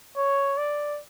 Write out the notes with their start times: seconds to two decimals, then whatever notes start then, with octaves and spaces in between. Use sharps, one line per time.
0.17 C#5
0.58 D5